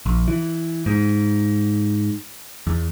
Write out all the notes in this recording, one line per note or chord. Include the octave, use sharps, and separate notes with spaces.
A#1
E3
G#2
E2